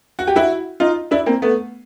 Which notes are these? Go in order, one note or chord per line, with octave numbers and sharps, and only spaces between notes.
F#4
G4
E4 F#4
D#4 F4
D4 E4
A#3 C4
A3 B3